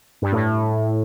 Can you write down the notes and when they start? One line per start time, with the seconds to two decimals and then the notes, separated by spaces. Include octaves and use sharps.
0.22 G2
0.32 A2